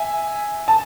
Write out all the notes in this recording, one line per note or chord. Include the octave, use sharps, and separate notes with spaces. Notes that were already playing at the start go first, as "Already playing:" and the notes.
Already playing: E5 G#5
A5